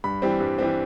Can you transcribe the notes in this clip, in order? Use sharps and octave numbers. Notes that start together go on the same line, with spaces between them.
G2 B5
E3 G3 C4
G2
E3 G3 C4